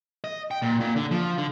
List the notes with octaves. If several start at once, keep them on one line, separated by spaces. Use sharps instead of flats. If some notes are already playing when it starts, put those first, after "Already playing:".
D#5
G5
A#2
A#2
D3
F3
D3